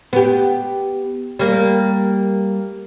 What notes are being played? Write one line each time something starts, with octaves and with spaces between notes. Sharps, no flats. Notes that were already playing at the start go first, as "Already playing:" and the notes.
B3 G4
G3 A#3